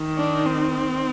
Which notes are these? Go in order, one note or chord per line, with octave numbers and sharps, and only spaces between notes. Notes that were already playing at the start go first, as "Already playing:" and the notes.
Already playing: D#3
D4
C4